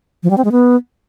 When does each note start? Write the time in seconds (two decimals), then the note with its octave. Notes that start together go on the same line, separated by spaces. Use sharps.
0.23 F3
0.30 G3
0.38 C4
0.45 G#3
0.52 B3